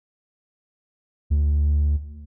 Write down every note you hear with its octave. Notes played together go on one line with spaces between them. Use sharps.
D2